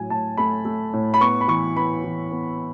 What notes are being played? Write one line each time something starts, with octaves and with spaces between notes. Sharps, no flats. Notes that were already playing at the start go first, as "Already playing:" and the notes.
Already playing: A2 F#3 G#5
A2 A5
A3 B5
A3
A2
B5
B3 C#6
B5
E3 C#6
B3 B5
E3
B3